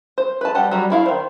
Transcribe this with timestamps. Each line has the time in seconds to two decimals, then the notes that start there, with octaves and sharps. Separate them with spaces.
0.18 C5
0.41 B4 A5
0.55 G3 G4 F#5 A5
0.71 F#3 G3
0.90 D4 E4 F5
1.06 D#3 C5